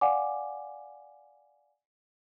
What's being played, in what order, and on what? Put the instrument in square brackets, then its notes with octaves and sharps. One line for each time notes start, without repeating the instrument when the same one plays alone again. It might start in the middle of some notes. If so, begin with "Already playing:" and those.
[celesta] D5 F5 F#5 G#5 D6